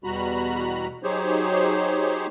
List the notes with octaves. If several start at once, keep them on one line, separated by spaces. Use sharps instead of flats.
E2 B2 G3 F#4 A#5 B5
F#3 D#4 G4 G#4 C5 C#5